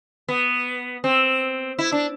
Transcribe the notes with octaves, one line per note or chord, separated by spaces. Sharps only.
B3
C4
E4
D4